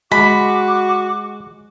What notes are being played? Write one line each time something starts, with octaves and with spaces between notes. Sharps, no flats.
G#3 F#4 B5 D6